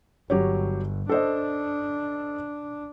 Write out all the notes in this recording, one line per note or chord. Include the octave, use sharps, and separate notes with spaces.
G1 F#3 G4 C#5
D4 A4 C5 D#5